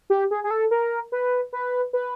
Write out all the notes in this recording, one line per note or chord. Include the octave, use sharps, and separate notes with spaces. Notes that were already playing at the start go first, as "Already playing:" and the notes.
G4
G#4
G#4
A4
A#4
B4
B4
B4